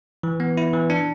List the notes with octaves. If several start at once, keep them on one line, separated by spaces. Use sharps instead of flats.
E3
B3
E4
E3
D4